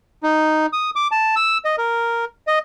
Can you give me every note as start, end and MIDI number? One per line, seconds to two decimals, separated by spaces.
0.23 0.66 63
0.73 0.90 87
0.96 1.08 86
1.12 1.35 81
1.36 1.58 88
1.65 1.76 75
1.78 2.25 70
2.47 2.59 75